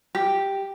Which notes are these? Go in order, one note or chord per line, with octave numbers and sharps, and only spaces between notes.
G4